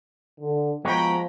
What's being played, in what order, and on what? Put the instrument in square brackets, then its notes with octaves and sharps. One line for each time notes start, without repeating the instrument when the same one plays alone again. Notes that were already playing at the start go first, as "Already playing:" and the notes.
[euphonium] D3
[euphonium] F3 [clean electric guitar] G#3 B3 F#4 [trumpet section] G5 A#5 B5